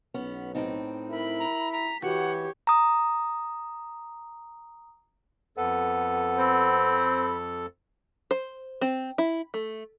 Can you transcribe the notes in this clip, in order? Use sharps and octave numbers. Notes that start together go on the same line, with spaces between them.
B1 B3 C#4
A2 C4 D#4
E4 A#4 B5
A#5
A#5 B6
E3 F#4 G4 C#5 F#5
A#5 D#6
F2 B3 A4
C4 B5
C5
C4
E4
A3